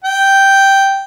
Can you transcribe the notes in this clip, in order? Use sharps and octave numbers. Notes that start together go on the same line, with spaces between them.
G5